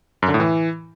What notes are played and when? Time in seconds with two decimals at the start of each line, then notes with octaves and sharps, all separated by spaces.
0.22 F#2
0.28 D3
0.34 A2
0.40 E3